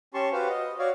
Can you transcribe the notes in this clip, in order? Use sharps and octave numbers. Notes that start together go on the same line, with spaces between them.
C#4 G4 A5 C6 C#6
F#4 G4 B4 C5 F5
D#5
F#4 C#5 D5 F5